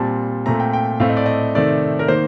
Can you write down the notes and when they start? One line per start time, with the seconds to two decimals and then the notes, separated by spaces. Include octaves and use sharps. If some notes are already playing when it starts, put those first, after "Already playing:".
Already playing: A#2 G3 C4 A5
0.46 A#2 A3 C4 A#5
0.60 G5
0.73 G5
1.00 A2 A3 C4 F5
1.09 D#5
1.17 D5
1.26 D#5
1.55 C3 D#3 A3 C4 D5
1.99 A#4
2.08 D#3 A#3 C5